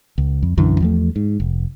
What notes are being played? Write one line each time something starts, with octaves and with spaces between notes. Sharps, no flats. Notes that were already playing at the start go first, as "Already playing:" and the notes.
C#2
F2
B1 F#2 D3 E3
E2 F3 A3
G#2
F1